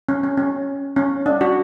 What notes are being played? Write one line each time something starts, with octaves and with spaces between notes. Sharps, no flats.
C#4
C#4
C#4
C#4
D4
F#4